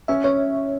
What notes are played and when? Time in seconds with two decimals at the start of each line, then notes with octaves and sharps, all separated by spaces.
0.08 C#4 E5
0.24 C#4 C#5